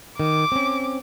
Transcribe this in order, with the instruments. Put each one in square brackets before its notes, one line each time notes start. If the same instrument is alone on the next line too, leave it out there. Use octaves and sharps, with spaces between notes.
[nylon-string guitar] D#3 [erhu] D6
[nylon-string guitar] C4 C#4